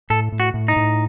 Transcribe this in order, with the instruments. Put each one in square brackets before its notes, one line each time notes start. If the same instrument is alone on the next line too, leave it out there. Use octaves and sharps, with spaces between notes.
[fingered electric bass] A2 [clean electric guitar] A4
[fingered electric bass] A2
[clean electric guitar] F#4
[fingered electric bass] A2
[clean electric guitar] D#4
[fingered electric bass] A2